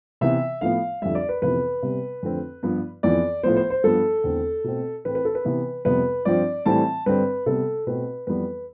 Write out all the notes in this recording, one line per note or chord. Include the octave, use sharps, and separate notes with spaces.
C3 E3 B3 E5
A2 F3 B3 F5
F2 D3 G3 E5
D5
B4
F2 C3 E3 B3 B4
C3 G3 B3
F2 D3 A3 C4
G2 F3 B3
F2 E3 B3 D5
A2 F3 B3 C5
C5
C5
G2 F3 B3 A4
E2 D3 A3 C4
B2 A3 C4
A2 E3 A3 C4 B4
B4
A4
B4
C3 E3 B3
F2 C3 G3 B3 B4
G2 F3 C4 D5
A2 E3 G3 C4 A5
G2 D3 G3 C4 B4
C3 G3 B3 A4
B2 A3 C4 B4
F2 E3 G3 B3 B4